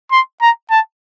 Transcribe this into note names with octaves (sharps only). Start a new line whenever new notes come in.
C6
A#5
A5